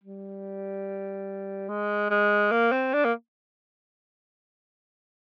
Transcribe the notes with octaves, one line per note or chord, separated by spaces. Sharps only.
G3
G#3
G#3
A#3
C4
D4
A#3